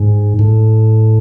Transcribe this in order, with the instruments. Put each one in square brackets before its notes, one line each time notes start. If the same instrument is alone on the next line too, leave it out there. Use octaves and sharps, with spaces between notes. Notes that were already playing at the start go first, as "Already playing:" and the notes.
Already playing: [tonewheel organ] G#2
A2